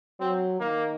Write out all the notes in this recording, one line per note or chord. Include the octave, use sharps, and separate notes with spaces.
F#3 C4
D#3 A#3